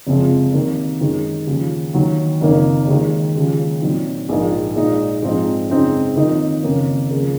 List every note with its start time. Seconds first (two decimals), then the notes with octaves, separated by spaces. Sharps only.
0.07 F#1 F2 C3 F3 G#3
0.54 C2 C3 D#3 A#3
1.01 F#2 D#3 G#3 D#4
1.47 D#2 C#3 F3
1.94 D#2 D#3 F#3
2.41 F#1 F2 D#3 A#3 D#4
2.87 D#2 D#3 G#3
3.35 D#2 C#3 F3 G#3
3.82 A#2 F#3 C4 D#4
4.29 A#1 G#2 F3 A#3 D#4
4.76 A#2 G#3 D#4
5.22 G#2 F3 G#3 C4 D#4
5.70 F#2 C#3 G#3 C4 D#4
6.16 F2 D#3 A#3 D#4
6.63 F#1 F2 D#3 A#3 C#4
7.10 C#2 C#3 F3 A#3